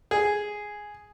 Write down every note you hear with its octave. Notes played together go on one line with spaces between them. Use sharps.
G#4